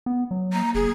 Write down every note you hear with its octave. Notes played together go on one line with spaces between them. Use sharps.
B3
F#3
A#3 A#5
F1 G#4